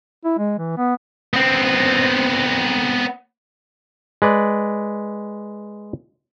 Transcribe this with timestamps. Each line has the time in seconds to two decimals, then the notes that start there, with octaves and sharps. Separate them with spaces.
0.25 E4
0.38 G#3
0.58 E3
0.77 B3
1.34 B3 C4
4.22 G#3 B4 D5